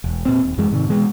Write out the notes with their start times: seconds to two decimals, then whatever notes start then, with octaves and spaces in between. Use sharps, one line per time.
0.04 E1
0.25 A#2 C4
0.43 D#1
0.58 F#2 E3 G#3
0.71 G#2 C3 D#3
0.88 B2 E3 G#3